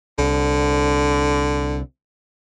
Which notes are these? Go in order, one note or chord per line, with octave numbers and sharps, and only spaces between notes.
C2 D3